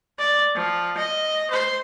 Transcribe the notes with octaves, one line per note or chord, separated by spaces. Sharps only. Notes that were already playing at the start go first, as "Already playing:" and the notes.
D5
F3
D#5
C5